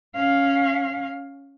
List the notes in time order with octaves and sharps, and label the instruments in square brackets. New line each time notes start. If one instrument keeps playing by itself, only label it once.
[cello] C#4 F5